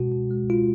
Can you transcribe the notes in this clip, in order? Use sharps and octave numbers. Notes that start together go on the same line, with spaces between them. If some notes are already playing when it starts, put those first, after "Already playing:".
Already playing: B2 G#3 F#4
B2
G#3
G#3 F4